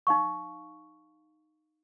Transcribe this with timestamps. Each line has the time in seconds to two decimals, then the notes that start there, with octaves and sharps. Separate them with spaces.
0.07 D#4 F5 C#6